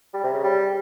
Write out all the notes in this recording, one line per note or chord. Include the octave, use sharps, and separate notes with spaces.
G3
C3
C#3
G3